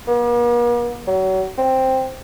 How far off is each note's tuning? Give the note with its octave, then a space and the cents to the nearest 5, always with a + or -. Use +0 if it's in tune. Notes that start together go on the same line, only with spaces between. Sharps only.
A#3 +45
F#3 +35
C4 +5